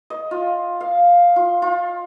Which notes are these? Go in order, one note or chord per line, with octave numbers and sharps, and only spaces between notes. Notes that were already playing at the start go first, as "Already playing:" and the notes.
D#5
F4
F5
F4
F4